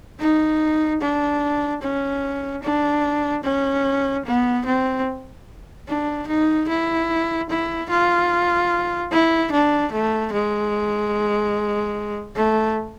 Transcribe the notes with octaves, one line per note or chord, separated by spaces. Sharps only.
D#4
D4
C#4
D4
C#4
B3
C4
D4
D#4
E4
E4
F4
E4
D4
A3
G#3
A3